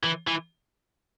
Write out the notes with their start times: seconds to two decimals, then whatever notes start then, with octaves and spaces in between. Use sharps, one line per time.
0.04 E3
0.28 E3